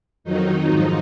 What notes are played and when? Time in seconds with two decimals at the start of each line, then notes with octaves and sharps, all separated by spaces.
0.24 F2 D#3 F#3 D#4
0.67 G#2 F3